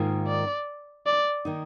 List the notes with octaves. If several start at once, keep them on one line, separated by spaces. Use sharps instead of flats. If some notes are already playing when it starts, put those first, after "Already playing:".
Already playing: G#2 D#3 A#3 F4
D5
D5
D#3 A#3 D#4